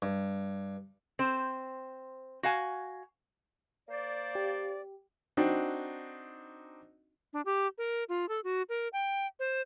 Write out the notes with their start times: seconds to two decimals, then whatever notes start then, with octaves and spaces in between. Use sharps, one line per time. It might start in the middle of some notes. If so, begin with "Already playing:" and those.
0.02 G2
1.19 C4 C5
2.43 F#4 F5 G#5
3.89 A#3 C5 D5
4.35 G4
5.37 C4 D4 D#4 F#4
7.33 D4
7.46 G4
7.78 A#4
8.09 F4
8.29 A4
8.44 F#4
8.69 A#4
8.93 G5
9.40 C5